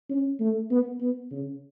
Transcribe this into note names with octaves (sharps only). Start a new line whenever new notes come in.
C#4
A3
B3
B3
C#3